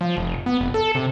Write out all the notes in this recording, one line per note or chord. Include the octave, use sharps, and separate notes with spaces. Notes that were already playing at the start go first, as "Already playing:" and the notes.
F3
F1
B3
F1
A4
C3